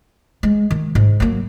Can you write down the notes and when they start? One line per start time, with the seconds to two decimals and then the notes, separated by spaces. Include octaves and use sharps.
0.43 G#3
0.71 D#3
0.95 G#2
1.20 F#3 A#3